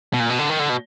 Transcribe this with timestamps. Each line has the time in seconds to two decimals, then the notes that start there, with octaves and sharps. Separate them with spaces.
0.13 B2
0.20 A#2
0.30 B2
0.39 D3
0.50 D#3
0.59 D3
0.69 B2